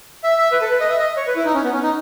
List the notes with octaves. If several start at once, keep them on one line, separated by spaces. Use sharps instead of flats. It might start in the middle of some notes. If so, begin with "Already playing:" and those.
E5
E5
B4
A4
B4
D#5
E5
D#5
C#5
B4
E4
D#4
C#4
B3
C#4
D#4